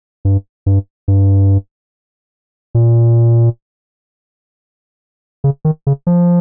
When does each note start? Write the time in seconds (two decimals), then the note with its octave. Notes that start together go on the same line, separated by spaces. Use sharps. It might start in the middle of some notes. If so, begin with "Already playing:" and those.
0.25 G2
0.66 G2
1.08 G2
2.75 A#2
5.44 C#3
5.65 D#3
5.87 C#3
6.07 F3